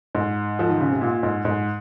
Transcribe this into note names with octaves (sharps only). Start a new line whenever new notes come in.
G#2
F3
D#3
C#3
C3
A#2
G#2
G#2